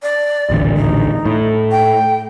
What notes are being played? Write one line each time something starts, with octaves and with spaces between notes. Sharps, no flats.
D5
D#1 A1 D2
D#4
A2
G5